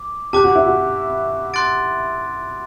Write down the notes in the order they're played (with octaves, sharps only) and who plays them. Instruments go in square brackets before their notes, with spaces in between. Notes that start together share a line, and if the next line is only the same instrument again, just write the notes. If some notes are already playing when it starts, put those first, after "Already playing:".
Already playing: [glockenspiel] D6
[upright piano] G4 [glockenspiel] A5 D6 F#6
[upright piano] F#4
E4
F#4
[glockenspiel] C6 F#6 A6 D7